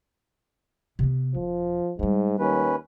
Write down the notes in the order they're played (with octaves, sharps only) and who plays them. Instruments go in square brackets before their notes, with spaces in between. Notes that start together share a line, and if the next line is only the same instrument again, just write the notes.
[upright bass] C3 B3
[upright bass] E1 [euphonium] F3
[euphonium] G#2 [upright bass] G3 G#3
[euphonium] D#2 [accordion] C#4 B4